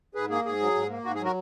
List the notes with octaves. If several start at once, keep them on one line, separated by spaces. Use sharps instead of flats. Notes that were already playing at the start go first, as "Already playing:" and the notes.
G#2 G#4 B4
A#3 G#4
G#2 G#4
F#3
G#2
A#3
G#2 F#4
G#4
F#3 F#4 A#4